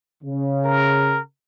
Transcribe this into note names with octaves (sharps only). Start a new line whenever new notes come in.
C#3
A#4